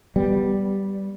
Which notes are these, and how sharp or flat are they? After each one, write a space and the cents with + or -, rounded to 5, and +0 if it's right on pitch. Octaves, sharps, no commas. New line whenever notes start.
G3 -5 B3 +0